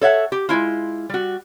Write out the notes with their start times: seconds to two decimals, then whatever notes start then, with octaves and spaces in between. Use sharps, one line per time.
0.01 A4 C#5 E5 F#5
0.32 G4
0.49 G#3 A3 E4 F4
1.10 G3 F#4